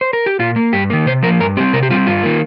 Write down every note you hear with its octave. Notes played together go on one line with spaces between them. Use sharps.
C5
A#4
G4
A#2 F4
A#3
G2 G4
D#3 A#3
C3 C5
F3 A#3 A#4
G2 A#4
G3 C4 G4
C3 A#4
G4
G3 C4 F4
G2 F4
D#3 A#3